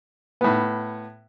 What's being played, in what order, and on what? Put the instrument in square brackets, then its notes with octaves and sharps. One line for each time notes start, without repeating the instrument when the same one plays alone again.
[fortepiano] A2 B3